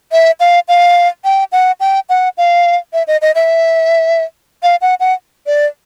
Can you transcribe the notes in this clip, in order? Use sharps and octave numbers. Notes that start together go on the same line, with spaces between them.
E5
F5
F5
G5
F#5
G5
F#5
F5
E5
D#5
D#5
E5
F5
F#5
F#5
D5